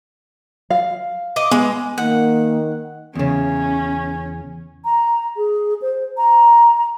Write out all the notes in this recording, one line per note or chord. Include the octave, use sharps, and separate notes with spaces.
F5
D#5 D6
G#3 B3
D#3 A#3 F#5
E2 C#3 C#4
A#5
G#4
C5
A#5